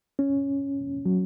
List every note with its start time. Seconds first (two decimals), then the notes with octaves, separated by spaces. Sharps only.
0.19 C#4
1.06 F#3